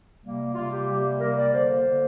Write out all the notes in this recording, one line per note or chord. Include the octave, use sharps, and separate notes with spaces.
C3 G3 A#3
C3 G3 A#3 F4
G4
C3 G3 A#3
C3 G3 A#3 A#4
D5
D3 A#3 C5
D3 A#3